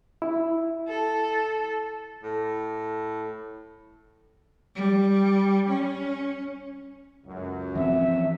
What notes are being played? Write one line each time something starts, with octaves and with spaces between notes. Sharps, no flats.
E4
A4
A2
G3
C#4
C#2 F#2
E3 F3 C4 E5